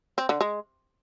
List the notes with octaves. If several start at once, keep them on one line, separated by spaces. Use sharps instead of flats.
C4
D3
G#3